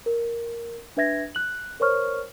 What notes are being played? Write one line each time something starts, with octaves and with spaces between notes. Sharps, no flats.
A#4
D4 B4 E5 G#6 A#6
F#6 F#7
A#4 C5 C#5 C#6 F6